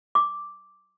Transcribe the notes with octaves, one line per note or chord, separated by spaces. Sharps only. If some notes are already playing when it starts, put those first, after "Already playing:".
D6